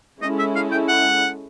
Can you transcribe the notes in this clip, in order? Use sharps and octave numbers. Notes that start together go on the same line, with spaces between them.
G#3 C#4 E4 A4 D#5
E5
F5
G5
F#5